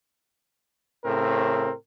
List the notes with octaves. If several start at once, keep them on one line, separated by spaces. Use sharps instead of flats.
A2 C#3 C4 A#4